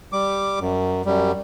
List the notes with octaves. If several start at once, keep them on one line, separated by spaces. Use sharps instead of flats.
G3 D6
F#2
F#2 G3